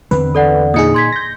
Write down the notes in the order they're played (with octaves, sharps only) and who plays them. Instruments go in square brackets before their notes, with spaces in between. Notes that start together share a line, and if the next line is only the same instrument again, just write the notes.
[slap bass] E2 D3 C4 [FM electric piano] B4
[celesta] A4 D5 F#5
[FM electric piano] A#2 D#4 G#4 [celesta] D#6 C#7
[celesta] C6 G#6 B6
[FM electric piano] G6 A#6